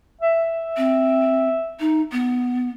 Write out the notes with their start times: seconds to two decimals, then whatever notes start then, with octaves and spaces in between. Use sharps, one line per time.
0.21 E5
0.77 C4
1.80 D#4
2.12 B3